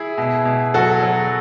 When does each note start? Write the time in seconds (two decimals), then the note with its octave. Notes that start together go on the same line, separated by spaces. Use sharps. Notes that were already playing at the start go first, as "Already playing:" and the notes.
Already playing: E4 G#4
0.18 B2
0.45 B2
0.74 F#3 F#4 A4
1.03 F#3